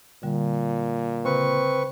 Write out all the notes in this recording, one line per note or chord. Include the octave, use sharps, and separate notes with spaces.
A#2 D3 G3
C#3 C4 B4 C#6